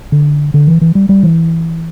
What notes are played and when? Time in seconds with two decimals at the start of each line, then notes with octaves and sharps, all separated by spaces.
0.12 D3
0.54 D3
0.67 E3
0.81 E3
0.95 G3
1.09 G3
1.23 E3